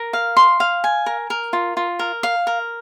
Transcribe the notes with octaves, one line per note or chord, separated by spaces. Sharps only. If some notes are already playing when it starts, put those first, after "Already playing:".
Already playing: A#4
F5
C6
F5
G#5
A#4
A#4
F4
F4
A#4
F5
A#4